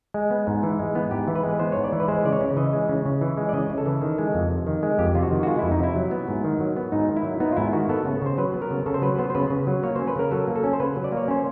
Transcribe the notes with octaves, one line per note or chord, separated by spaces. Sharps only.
G#3
B3
G#2
E3
G#3
B3
G#2 G4
E3
B4
G#3
B3 C5
G#2 C#5
D5
E3
B4
G#3 C5
C#3 D5
C#5
C#3
E3 D#5
G#3
C#3
C#3
E3
G#3
D5
C#3 D#5
C#3
A4
E3
D#3
G#3
F2
C3
D#3
G#3
F2 G4
C3 F4
F#4
D#3
F#4
G#3 F4
E4
F2
D#4
C3 E4
F#3
B3
G#2
D#3
F#3
B3
G#2 D#4
D#3
E4
F#3
B3 D#4
F4
G#2 E4
D#3 F#4
B3 A4
C#3
C#3 C5
F#3 B4
B3
A#4
C#3
C#3 A4
C5
F#3 B4
B3 C5
C5
C#3 B4
C#3
F#3
A#3 C#5
C#4 C5
B4
C#3 A#4
F#3 A4
A#3
A4
C#4
C5
C#3 B4
F#3
D5
A#3 C#5
C#4 C5